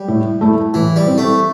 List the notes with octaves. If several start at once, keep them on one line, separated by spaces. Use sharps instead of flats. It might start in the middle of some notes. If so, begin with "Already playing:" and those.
Already playing: G3
A2
A3 E4
A2 E3
G3
E3 C4
A3